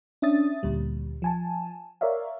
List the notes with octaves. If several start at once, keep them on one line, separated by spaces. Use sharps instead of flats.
C#4 D4 E5 D#6 A6
D2 A#2 G3
F3 G#5 A5
A#4 C#5 D5 E5 F5